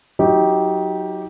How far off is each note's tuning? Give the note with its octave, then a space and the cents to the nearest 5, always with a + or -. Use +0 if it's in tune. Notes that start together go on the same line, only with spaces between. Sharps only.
F#3 +0 D#4 +30 G4 -5